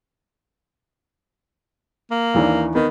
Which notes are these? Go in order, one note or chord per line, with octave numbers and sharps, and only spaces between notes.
A#3
D#2 E3 D4
D#3 B3